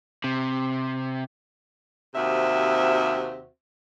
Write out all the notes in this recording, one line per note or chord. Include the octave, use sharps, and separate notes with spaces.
C3
D#2 C3 C4 F#4 E5